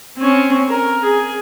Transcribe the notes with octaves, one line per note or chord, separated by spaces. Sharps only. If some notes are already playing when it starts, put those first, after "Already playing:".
C4 C#4
A#4
G#4